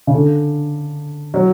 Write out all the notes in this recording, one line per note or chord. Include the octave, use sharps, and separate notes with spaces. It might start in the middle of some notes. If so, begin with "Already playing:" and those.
C#3
D3
F#3